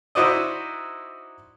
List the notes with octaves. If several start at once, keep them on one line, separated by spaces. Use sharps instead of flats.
D#4 E4 F#4 C5 D5 D#5